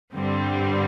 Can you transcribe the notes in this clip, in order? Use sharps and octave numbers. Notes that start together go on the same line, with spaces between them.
G2 D3 G3 C4